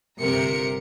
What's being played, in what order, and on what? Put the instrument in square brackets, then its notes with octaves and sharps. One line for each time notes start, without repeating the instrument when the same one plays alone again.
[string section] G1 C3 A#4 C#7